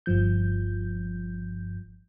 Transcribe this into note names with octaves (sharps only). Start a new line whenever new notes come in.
G1 G2 F3 G6